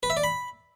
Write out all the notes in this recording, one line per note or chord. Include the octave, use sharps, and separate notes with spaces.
B4
E5
D5
B5